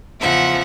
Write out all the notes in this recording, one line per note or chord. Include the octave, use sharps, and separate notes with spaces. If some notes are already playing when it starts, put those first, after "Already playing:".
E2 C#3 F3 E5 F#5